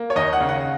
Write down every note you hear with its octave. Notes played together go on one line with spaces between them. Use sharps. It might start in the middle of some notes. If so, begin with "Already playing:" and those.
Already playing: A#3
C#5
D#2 D#5
F#5
C#3
F#5